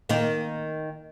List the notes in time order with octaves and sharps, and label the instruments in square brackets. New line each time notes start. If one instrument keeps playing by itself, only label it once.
[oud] D#3 A#3